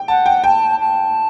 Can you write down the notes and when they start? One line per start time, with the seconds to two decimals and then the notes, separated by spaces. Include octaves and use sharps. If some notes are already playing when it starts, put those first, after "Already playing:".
Already playing: G5
0.08 F#5 A5
0.26 G5
0.43 G5 A5
0.79 A5